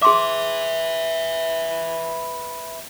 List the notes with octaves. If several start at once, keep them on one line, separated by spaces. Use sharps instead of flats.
G#4 B4 E5 C6 D6